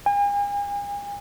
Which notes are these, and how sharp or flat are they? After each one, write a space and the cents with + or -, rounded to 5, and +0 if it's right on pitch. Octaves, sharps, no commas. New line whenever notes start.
G#5 -40